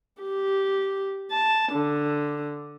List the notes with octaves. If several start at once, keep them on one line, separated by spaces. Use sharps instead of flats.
G4
A5
D3